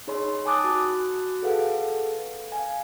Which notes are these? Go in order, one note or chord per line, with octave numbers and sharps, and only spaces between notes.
D#4 G#4 C#5 D#5 B5 C6
G#5 A5 D6 D#6 F#6 A6
F#4 F#6
G#4 A4 B4 F5 F#5
F5 G#5